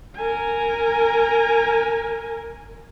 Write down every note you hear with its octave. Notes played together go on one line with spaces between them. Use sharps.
A#4 G#5